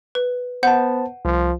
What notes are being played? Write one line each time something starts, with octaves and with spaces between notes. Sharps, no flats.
B4
B3 C5 F#5 A5 G6
C2 F3